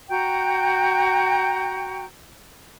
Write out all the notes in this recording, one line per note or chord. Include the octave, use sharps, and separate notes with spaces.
F#4 G5 A#5 G6